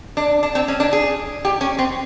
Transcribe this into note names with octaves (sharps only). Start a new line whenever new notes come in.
D4
D4
C4
C#4
D4
G#4
G4
C#4
C4